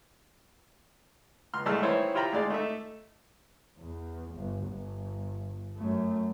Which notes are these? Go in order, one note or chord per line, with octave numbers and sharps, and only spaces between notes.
C#2 C6 F6
C2 G#3 A3 A5 E6 F6
D#3 E3 E4 C5 C#5 E6
E4 F4 G4 G5 A#5 B5
D2 G#3 D5 F5
A3 D#4 A4 E5
E2
G1
G1
F#2 A3